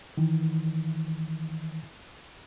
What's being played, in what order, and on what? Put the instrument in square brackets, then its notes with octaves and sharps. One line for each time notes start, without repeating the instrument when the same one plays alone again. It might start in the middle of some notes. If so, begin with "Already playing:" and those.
[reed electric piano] D#3 E3